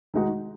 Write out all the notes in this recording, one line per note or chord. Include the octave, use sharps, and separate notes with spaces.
D#3 G#3 D#4 F#4